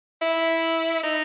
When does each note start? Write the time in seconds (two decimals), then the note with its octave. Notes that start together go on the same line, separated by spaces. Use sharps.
0.22 E4
1.04 D#4